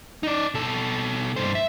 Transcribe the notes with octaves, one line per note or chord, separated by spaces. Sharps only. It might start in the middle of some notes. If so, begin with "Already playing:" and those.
D#4 D5
B2 A4
G2 C5
E5